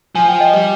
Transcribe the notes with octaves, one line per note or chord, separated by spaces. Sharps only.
F3 G#5
G5
D#5
G3